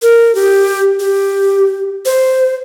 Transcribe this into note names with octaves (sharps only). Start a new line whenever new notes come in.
A#4
G4
G4
C5